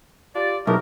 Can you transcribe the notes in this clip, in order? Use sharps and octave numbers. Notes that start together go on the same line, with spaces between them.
F4 G4 D5
B1 E4 G#4 A#4